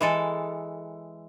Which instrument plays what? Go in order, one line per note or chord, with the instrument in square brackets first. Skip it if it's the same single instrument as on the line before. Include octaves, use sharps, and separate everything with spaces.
[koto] E3 G#3 A4